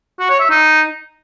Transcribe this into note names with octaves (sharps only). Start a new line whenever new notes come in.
F#4
C#5
E5
D#4